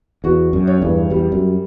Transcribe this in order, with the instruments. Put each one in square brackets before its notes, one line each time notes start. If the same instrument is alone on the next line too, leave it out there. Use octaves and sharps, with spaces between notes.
[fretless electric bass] E2 [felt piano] F#4
[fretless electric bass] F#2
[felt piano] C#5
[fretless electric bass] E2 G2
[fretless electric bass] E2 [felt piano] G3
[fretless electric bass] F#2